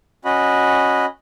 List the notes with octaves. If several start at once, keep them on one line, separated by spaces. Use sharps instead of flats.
C#4 F#4 D#5 B5